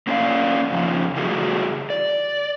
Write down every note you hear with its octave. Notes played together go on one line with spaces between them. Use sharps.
A#3 C#4 F4 B4 D5 F5
F2 C#3 F3
C#3 E3 G3 A3 F#4 G#4
D5